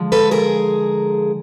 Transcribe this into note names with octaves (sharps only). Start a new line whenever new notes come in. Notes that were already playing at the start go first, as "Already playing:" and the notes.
Already playing: D3 F3 G#3
A4 B4
G#4 A#4